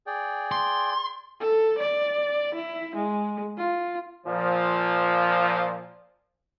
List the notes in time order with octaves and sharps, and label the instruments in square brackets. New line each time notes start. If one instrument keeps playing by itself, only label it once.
[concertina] G#4 D5 G5
[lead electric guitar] C6
[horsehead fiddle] A4
D5
E4
G#3
F4
[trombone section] A#2 F3